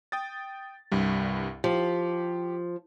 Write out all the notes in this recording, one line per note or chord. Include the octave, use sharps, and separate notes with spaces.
G5 D#6 A6
C2 G2 G3
F3 G4